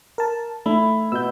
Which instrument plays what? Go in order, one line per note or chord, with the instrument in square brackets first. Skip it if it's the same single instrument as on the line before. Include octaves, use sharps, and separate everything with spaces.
[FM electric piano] A#4 A5
[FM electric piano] A3 [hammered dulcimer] E4
[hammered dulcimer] B2 [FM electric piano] E6 G6